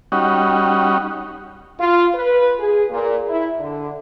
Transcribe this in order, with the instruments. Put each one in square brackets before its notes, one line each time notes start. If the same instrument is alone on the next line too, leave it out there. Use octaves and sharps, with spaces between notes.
[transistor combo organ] G3 C#4 D#4 F#4
[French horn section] F4
B4
G#4
A#2
E4
D3